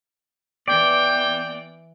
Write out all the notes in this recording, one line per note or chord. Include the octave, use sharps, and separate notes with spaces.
E3 B3 D5 G5